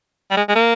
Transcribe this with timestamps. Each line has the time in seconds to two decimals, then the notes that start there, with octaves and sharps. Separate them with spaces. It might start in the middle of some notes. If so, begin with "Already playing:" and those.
0.31 G3
0.37 G#3
0.49 G#3
0.55 A#3